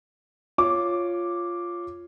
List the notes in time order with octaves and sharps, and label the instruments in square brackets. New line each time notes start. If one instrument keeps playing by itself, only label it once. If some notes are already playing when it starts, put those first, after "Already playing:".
[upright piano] F4 C#5 D6